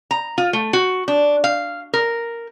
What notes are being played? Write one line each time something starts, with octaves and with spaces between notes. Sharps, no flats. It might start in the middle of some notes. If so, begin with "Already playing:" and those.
A#5
F4
A3
F#4
D4
F5
A#4